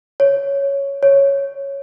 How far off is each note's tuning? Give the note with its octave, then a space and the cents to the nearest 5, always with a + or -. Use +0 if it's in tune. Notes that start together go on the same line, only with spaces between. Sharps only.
C#5 +5
C#5 +0